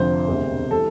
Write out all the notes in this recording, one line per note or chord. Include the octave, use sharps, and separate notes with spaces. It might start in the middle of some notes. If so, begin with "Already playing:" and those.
Already playing: F1 F2 D3 F3 C5
E1 D2 C3
E3 G3 A4